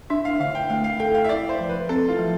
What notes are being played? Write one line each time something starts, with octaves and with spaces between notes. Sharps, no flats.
D4 E5
F5
D3 F5
G5
A3 F5
F5
A4 G5
F5
E5
E4 D5
C5
F3
B4
C4 A4
F4
F3